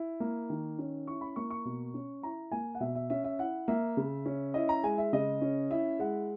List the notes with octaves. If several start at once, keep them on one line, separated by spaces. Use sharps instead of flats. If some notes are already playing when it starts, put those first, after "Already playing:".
Already playing: E4
A#3
D#3
C#4
E4 C#6
B5
A#3 C#6
C#6
B2
C#4
E4 A#5
A#3 G#5
F#5
B2 E5
E5
C#4 E5
E5
E4 F#5
A#3 E5
C#3
C#4
E4 D#5
A#5
G#3 G#5
E5
C#3 D#5
C#4
E4 E5
G#3 F#5